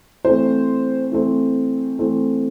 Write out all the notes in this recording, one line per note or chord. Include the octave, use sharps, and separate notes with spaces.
E3 A3 C4 C5
E3 A3 C4
E3 A3 C4